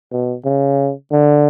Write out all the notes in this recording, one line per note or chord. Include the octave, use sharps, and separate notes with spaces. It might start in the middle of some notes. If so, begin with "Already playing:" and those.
B2
C#3
D3